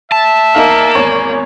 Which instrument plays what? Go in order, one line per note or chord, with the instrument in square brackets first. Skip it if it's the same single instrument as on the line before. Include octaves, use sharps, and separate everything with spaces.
[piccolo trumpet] E5 [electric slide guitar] A5
[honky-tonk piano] E2 D#4 F5 [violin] A#3
[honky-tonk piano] G#1 E2 C#5